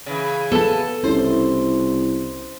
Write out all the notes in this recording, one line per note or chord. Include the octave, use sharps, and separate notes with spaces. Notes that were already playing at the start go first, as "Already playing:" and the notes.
C#3 E3
B3 A4 A5
C2 C#4 E4 C5